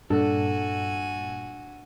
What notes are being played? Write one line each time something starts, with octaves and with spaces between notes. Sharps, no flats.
G2 A#2 D4 F#4 A4 G#5